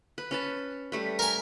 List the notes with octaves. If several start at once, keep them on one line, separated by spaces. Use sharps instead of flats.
B4
C#4 B4 A5
G3 A3 B4
A#4 G#5